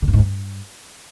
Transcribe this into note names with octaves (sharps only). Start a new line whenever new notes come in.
D3
G2
G#2
G2